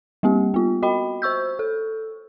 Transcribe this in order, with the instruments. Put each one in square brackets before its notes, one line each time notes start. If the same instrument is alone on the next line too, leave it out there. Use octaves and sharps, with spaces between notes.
[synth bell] G3 A#3 C4 G4
B3 F4
F#4 D#5 G5 B5
C5 C#6 E6 G6
A4